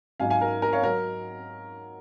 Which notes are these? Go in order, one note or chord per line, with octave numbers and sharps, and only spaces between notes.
G#1 G#2 F#3 F5 G#5
F5 G#5
A#4
A#4
C#5 F5
F#3 A#4